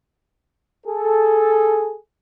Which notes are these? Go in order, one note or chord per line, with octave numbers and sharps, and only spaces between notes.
G#4 A4